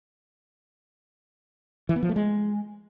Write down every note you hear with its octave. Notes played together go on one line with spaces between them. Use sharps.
E3
B3
F3
A3
G#3